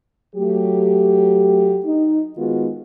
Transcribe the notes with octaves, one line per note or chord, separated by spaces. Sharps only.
F#3 A3 G4
D#4
D#3 G#3 B3 D#4 F4 F#4